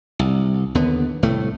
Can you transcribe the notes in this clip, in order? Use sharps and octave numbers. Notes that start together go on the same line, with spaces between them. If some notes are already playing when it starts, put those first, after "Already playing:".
C2
D#2 D3 B3
C2 A2 A3